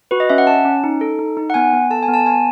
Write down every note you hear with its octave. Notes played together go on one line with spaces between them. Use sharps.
F#4 B4
D#5
C#4 E5
F#5
C#4 A5
C#4
D#4
A4
D#4
D#4
F#5
B3 G#5
B3
A4 A5
G#5
B3
A5
B3 G#5